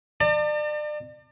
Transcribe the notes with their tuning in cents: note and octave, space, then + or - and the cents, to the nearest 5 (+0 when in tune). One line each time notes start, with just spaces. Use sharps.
D5 +35 A5 +45